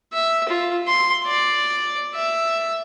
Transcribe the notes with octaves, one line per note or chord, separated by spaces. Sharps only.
E5
F4
C6
D5
E5